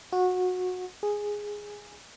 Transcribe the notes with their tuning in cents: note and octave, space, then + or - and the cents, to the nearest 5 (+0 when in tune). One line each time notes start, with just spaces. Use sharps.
F#4 -20
G#4 -5